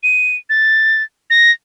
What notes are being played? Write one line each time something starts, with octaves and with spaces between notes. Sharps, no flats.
D#7
A6
A#6